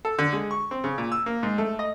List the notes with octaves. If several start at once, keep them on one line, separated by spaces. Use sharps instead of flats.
A4
D3
G#3
C#6
C4
C#3
A#2
E6
A#3
G#2
A3
D#5